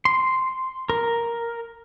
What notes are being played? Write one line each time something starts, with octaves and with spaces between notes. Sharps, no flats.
C6
A#4